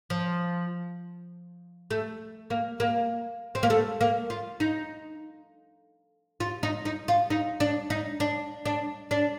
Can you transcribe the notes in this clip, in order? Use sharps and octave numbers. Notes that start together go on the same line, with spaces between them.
F3
A3
A#3
A#3
C4
A#3
A3
A#3
F4
D#4
F4
D#4
D#4
F4
D#4
D4
D#4
D4
D4
D4